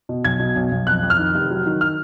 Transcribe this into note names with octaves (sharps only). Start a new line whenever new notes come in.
B2
B1 G#6
B2
B1
B1
F2 F#6
F2
F6
D#3
F1
F#3
D#3
F6